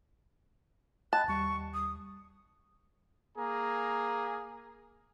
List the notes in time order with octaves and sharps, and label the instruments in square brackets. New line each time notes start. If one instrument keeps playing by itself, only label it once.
[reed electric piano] D#5 G5 B5 [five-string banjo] A5 [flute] F#6
[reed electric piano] D#2 G3 [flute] C#6
[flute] D#6
[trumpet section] A#3 G#4 A#5